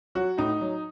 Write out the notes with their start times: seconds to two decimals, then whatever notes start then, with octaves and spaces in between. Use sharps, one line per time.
0.15 F#3 F#4
0.38 A2 D#4
0.61 F#3